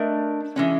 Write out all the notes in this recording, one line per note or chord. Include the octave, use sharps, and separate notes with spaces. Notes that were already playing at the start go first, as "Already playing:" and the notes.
Already playing: A3 D4 A#4 D#5
E3 G#3 C#4